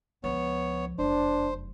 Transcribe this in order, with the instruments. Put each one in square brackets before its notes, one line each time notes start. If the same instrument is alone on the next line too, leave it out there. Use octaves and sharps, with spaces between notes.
[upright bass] C#2 F3 [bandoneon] B3 C#5
[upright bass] F1 F#2 [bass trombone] D4 [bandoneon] C5